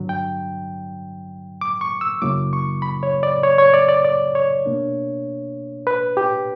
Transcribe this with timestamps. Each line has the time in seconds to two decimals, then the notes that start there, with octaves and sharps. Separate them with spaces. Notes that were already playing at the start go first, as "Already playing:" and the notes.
Already playing: G2 D3 F#3
0.09 G5
1.61 D6
1.81 C#6
2.01 E6
2.22 F#2 C#3 F#3 A#3 E4 D6
2.53 C#6
2.82 B5
3.03 C#5
3.23 D5
3.43 C#5
3.58 C#5
3.73 D5
3.89 D5
4.05 D5
4.35 C#5
4.66 B2 A#3 D4
5.87 B4
6.17 G4